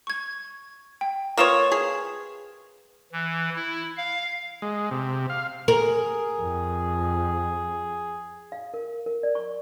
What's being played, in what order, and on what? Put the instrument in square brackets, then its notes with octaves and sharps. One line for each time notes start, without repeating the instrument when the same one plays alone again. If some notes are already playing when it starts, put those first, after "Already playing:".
[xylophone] C#6 G#6
G5
[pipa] A#3 F4 C#5 [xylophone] B4 D#6 E7
[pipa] G#4 [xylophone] G#6
[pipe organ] E3
E4
F5
[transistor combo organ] G#3
C3
F5
[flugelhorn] G#4 [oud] A#4
[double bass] F2
[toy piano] F5
A#4
A#4
D5
C#6